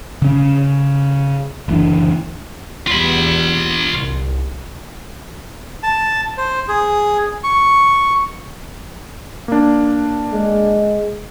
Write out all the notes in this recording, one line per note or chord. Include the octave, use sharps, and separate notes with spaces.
C#3 C#4
F#1 D2 E3 D4
E2 G3 B3 F4 B5
C2
A5
C5
G#4
C#6
A#3 D4
G#3